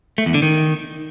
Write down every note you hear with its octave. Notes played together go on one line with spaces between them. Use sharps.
A3
E2
D3
D#3